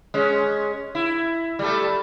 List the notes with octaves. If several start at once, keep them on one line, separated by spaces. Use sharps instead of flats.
G#3 C#4
E4
G3 A3 A4